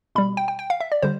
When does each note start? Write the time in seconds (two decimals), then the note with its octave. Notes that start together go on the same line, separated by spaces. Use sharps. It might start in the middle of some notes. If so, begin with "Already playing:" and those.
0.15 B2 G3 B5
0.37 G5
0.48 G5
0.59 G5
0.70 F5
0.80 E5
0.92 D5
1.02 D3 G3 C5